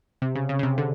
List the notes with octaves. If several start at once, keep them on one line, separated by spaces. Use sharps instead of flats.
C3
C#3
C#3
C#3
C3
D3